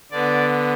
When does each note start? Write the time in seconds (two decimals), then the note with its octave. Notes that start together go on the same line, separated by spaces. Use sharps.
0.11 D3 B3 D5